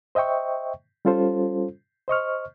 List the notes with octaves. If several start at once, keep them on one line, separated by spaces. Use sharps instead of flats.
C5 D#5 E5 G5 C#6
G3 C#4 F4 A4 C5
C5 D#5 C#6 F6